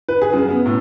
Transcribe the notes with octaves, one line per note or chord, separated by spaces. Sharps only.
B4
G#4
F#2
B3
A2